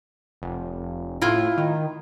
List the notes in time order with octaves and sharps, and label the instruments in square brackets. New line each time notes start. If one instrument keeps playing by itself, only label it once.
[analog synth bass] F1
[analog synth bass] A2 [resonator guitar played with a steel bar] E4 F4
[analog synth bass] D#3